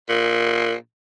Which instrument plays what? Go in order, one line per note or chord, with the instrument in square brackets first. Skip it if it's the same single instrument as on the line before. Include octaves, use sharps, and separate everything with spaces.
[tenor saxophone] A#2